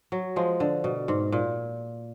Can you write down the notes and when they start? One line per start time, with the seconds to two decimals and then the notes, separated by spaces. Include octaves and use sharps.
0.12 F#3
0.36 F3 G#3
0.60 D3
0.84 B2
1.08 G#2
1.32 A#2